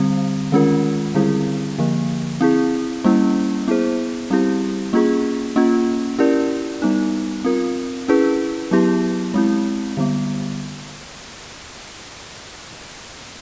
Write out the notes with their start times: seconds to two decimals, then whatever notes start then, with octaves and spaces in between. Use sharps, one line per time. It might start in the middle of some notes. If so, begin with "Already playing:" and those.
Already playing: D3 G3 C4
0.52 D#3 G#3 C#4 F4 A#4
1.15 D3 G3 C4 E4 G#4
1.78 D3 F3 A#3
2.41 C4 E4 G#4
3.04 G3 A#3 C#4 E4
3.68 B3 E4 G#4 C5
4.30 G3 C4 E4 G4
4.93 A#3 C#4 F4 G#4
5.56 A#3 C#4 F4
6.19 C#4 E4 G4 A#4 D5
6.82 G3 B3 D#4
7.45 C4 F4 A#4
8.08 C#4 E4 G#4 B4
8.71 F#3 B3 E4 G4
9.34 G#3 C4 E4
9.97 D3 G3 B3